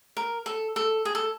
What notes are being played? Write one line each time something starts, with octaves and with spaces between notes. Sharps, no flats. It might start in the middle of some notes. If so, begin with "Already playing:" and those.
A#4
A4
A4
G#4
A4